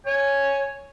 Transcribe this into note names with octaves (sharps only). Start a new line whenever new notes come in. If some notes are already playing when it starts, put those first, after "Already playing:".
C#5 G#5